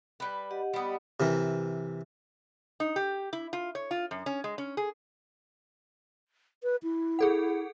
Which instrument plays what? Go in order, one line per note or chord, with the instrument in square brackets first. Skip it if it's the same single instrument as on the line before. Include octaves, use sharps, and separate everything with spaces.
[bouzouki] G3 B4
[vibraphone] G4 D#5 F#5
[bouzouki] G3 B3
[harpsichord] C3 E3 A#4
[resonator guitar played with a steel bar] D#4
G4
E4
F4
C#5
F4
F#2
C#4
G#3
C#4
G#4
[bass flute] B4
E4
[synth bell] G#4 A4 F#5